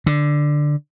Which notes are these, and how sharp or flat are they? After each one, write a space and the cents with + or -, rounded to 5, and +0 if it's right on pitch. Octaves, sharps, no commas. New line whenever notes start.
D3 +5